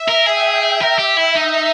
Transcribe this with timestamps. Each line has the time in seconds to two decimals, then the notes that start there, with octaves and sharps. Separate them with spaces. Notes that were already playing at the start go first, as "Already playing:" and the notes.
Already playing: E5
0.08 A#4
0.26 G#4 G5
0.80 A#4 E5
0.98 G4
1.17 E4
1.35 D#4